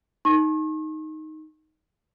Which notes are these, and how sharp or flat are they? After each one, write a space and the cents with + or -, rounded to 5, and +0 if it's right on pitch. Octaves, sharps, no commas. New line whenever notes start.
D#4 +5 C#6 -45